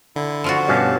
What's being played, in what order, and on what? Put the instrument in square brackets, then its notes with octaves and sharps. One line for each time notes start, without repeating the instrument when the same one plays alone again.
[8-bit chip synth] D3 [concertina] E4
[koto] F3 F4 F#4
[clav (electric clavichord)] G2 B2 C#4 [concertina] G4 F5 A5